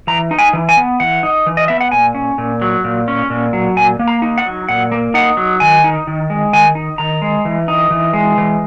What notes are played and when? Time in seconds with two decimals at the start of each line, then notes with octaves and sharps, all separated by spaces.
0.07 E3 A#5
0.31 D#4
0.39 G#5
0.53 E3
0.69 G#5
0.77 B3
1.00 E3 F#5
1.23 D#4
1.47 E3
1.57 D#5
1.68 B3 E5
1.81 F#5
1.92 A#2 G#5
2.15 C#4
2.38 A#2
2.61 F#3
2.84 A#2
3.08 C#4
3.30 A#2
3.53 F#3
3.76 A#2 G#5
3.99 A#3
4.08 A#5
4.22 D#4
4.38 F#5
4.46 F#3
4.68 A#2 F#5
4.92 A#3
5.14 D#4 F#5
5.37 F#3
5.60 D#3 G#5
5.84 D#4
6.07 D#3
6.30 G#3
6.53 D#3 G#5
6.75 D#4
6.98 D#3 A#5
7.22 G#3
7.45 E3
7.68 D#4
7.91 E3
8.13 G#3
8.38 E3